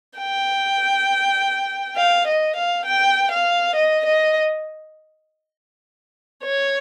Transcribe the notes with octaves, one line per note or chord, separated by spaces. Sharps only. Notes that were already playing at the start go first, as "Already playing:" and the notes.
G5
F5
D#5
F5
G5
F5
D#5
D#5
C#5